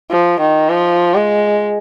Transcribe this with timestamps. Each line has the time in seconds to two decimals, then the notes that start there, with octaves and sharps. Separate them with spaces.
0.10 F3
0.41 D#3
0.69 F3
1.14 G#3